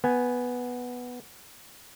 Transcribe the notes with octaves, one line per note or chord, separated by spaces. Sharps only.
B3 G#5